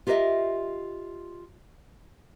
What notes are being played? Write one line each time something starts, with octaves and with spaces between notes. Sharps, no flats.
F4 G4 A#4 B4 D#5 E5